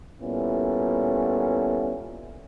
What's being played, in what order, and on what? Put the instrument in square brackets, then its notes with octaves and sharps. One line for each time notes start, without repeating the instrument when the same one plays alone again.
[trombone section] A#2 G3 B3 C#4 E4 A4